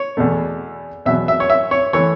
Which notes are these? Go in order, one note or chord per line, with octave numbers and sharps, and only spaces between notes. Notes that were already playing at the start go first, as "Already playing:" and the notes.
Already playing: C#5
E2 B2 A3
E2 B2 F#3 E5
E5
C#5
E5
C#5
E3 A3 C#5